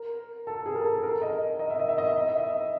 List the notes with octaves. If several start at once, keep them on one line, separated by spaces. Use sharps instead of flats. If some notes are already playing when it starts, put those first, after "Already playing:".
Already playing: A#4
A4
G#4
A#4
A4
A#4
D#5
D#5
E5
D#5
E5
D#5
E5
D#5
E5
D#5